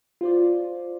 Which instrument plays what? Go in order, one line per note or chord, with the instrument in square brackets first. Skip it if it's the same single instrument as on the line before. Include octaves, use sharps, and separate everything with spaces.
[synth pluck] F4 C5 D5